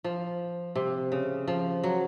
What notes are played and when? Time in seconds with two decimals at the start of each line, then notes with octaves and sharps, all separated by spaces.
0.04 F3
0.75 C3
1.12 C#3
1.48 F3
1.84 F#3